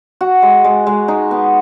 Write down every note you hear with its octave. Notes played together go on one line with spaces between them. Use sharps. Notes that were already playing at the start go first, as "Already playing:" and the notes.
F#4
G#3
G#3
G#3
D#4
B3